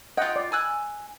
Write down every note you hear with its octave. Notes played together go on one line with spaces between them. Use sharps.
F4 D#5 F#5 G5
D5
G#5 E6 F#6